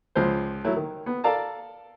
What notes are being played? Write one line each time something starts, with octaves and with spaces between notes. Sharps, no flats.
C#2 F3 C5
F#3 A3 E4
D#3
B3
A4 A#4 D5 F5 A5 A#5